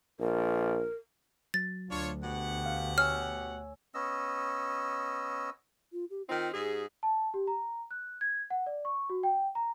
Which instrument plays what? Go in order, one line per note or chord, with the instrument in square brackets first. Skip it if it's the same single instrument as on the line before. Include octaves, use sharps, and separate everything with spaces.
[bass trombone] A#1 [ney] A#4
[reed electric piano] F#3 [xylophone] A6
[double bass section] D2 [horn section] D4 F4 C#5
[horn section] B2 G4 F#5
[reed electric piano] F5
[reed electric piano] C#5 G#5 E6 [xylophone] F6
[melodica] B3 C#4 D#5 E6
[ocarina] F4
G4
[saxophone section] D#3 C4 D#4 [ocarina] F4
[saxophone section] G#2 G#4 [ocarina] G4
[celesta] A5
G4
A#5
F#6
G#6
F#5
D5
C#6
F#4
G5
A#5